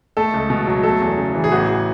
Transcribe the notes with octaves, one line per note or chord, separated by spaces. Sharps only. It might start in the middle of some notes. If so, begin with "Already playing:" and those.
A3 A4
C#2
B2
F#3
A3 A4
E2
C#3
E3
G#4
A1 F#4